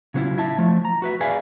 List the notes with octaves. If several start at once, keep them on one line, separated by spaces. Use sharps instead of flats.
C#3 F#3 A#3 C4 E4 F4
E4 E5 A5
F3 A3
A#5
F#4 B4 E5
G#4 B4 D5 E5 F5 G#5